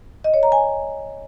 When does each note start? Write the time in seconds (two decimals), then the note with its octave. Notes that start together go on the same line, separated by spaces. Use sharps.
0.24 D#5
0.34 C#5
0.43 A#5
0.52 G#5